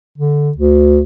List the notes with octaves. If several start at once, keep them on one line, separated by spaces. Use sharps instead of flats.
D3
D2